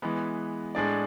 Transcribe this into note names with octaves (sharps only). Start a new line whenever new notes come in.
E3 G#3 B3
A2 G#3 D4 G#4 D5